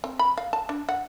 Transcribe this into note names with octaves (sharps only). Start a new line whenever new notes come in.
C4
B5
F5
A5
D4
F#5